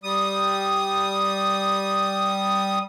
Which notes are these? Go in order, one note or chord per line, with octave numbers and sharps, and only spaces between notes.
G3 D#6